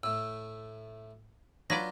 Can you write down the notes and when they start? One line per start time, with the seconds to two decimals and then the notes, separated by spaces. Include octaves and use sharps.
0.03 A2 A3 E6
1.70 F#3 D4 F4 B4 D5 A#6